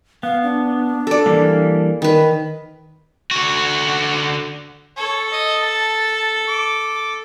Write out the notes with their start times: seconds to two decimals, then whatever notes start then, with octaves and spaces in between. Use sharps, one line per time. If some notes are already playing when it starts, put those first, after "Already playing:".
0.23 B3 F5
0.43 D4
1.07 A4 D5
1.26 E3 G3 A#3
2.02 D#3 B4 B5
3.31 D3 F#4
4.97 A4 C#5
5.32 D#5
5.62 A5
6.48 D6